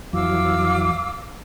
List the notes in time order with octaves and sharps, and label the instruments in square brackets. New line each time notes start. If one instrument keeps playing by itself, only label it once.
[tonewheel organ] F2 E3 F#3 [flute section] F5 D6 E6